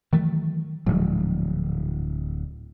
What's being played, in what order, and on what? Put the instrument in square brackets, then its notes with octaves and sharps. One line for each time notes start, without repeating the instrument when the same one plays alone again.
[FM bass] D#3 [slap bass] E3 F#3 A3
[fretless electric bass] D1 [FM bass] G#2 [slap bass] F3 G#3